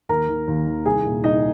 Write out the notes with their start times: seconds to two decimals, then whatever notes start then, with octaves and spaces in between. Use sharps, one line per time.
0.09 D#2 A#4 A#5
0.28 D#3
0.47 D#2
0.67 D#3
0.85 C2 G#4 G#5
1.05 A#2
1.24 C2 D#4 D#5